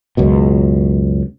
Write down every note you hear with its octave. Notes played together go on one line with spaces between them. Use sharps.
C#2 F#2 B2